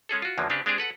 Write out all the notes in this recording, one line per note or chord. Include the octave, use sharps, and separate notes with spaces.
G#3 C#4 G#4 A4
F4 F#4
E2 D3 F3 F#3 A#3
C#3 C4 D4 G4 B4
G#3 C4 D4 G4 G#4
A4 B4 F#5